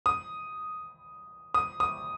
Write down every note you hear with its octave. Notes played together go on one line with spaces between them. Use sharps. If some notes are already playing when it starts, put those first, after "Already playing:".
D#6
D#6
D#6